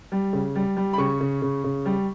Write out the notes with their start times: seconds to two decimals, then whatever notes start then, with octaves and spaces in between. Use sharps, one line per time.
0.12 G3
0.33 C#3
0.55 G3
0.77 G3
0.93 B5
0.98 C#3 C#6
1.21 C#3
1.42 C#3
1.64 C#3
1.85 G3